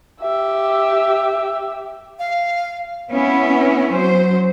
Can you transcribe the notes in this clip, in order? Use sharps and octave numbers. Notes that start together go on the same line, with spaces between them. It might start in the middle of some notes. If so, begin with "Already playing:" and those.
G4 E5
F5
B3 C#4 E4
F#3 C5